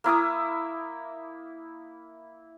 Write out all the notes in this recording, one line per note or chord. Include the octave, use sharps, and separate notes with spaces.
A#3 E4 D6 D#6